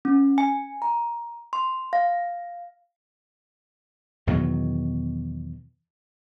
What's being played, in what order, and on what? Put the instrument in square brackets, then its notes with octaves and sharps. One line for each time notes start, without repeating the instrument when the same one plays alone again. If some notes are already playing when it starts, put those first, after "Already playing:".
[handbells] C#4
G#5
A#5
C6
F5
[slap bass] E2 B2 D#3 F#3